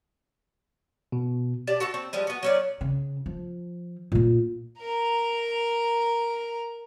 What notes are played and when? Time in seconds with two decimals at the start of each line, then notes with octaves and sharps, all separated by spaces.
1.12 B2
1.67 G4 D5 A5
1.80 F#4 A4 A5
1.94 C4
2.13 F3 G3 G#3
2.27 B3 F#4
2.43 F#3 C#4 D5
2.81 C#3
3.26 F3
4.12 A#2 A#3
4.80 A#4 A#5